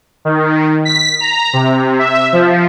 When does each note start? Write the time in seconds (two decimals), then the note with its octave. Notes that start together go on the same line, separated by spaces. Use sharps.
0.25 D#3
0.85 B6
1.20 A#5
1.53 C3
1.99 E5
2.33 F3